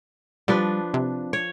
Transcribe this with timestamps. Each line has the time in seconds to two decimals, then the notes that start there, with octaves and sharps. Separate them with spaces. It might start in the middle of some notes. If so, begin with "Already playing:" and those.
0.48 F3 G3 D4 B4
0.94 C3
1.33 C#5